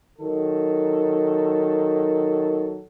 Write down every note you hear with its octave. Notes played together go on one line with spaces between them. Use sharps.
D#3 F#3 A4